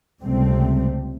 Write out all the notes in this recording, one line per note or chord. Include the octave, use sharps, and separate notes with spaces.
C#2 C3 G3 A3 C4